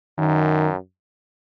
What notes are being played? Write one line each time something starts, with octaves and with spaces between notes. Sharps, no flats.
F#2 D#3